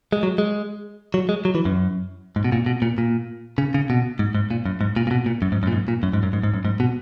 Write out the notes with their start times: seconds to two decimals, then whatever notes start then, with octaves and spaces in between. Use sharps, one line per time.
0.13 G#3
0.23 F#3
0.38 G#3
1.14 F#3
1.29 G#3
1.45 F#3
1.55 E3
1.65 F#2
2.36 G#2
2.44 B2
2.52 A#2
2.66 B2
2.82 A#2
2.98 A#2
3.58 C#3
3.74 C#3
3.90 B2
4.19 G#2
4.35 G#2
4.51 A#2
4.66 F#2
4.81 G#2
4.96 A#2
5.07 A#2
5.11 B2
5.26 A#2
5.42 F#2
5.52 G#2
5.63 F#2
5.67 A#2
5.72 G#2
5.88 A#2
6.03 F#2
6.13 G#2
6.23 F#2
6.33 G#2
6.43 G#2
6.54 F#2
6.65 G#2
6.80 B2